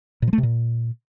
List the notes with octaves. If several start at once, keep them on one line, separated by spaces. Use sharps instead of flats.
A#2
F3
A3
C3
A#2